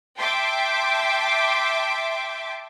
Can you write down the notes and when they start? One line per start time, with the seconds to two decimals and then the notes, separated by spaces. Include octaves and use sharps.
0.19 E5 G5 A5 C6 D6